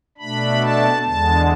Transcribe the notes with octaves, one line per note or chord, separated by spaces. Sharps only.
B2 A3 D4 B5
A5
E2 D3 G#3 A5